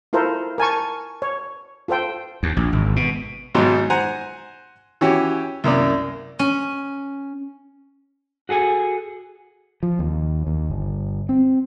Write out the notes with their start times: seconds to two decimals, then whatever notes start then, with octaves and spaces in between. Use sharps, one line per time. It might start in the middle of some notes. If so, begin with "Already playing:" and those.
0.13 E4 F4 A4 A#4 C5
0.58 A#4 G#5 A5 C#6
1.22 C#5
1.88 F4 A4 C5 G5
2.43 D#2
2.57 A#1
2.73 G#1
2.96 B2
3.54 G#1 G#2 B2 F#3 D#4 C6
3.90 C5 F#5 G#5 A#5
5.01 E3 C#4 F#4 G4
5.64 C2 F#2 A#3 D5
6.39 C#4
8.49 F#4 G#4 A4 G#5
9.83 F3
9.99 D#2
10.47 D#2
10.70 G1
11.29 C4